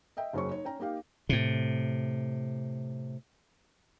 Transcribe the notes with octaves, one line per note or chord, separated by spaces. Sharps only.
D#5 E5 G5
F#1 F#3 C#4 G#4 C5 C#6
D#4 C#5
C#4 G5 A#5
A#3 D#4 G4 F5
A2 C3